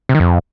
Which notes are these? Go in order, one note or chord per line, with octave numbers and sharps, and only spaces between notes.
C3
D#3
F2